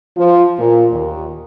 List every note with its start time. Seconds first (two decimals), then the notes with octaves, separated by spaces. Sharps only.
0.17 F3
0.59 A#2
0.92 D#2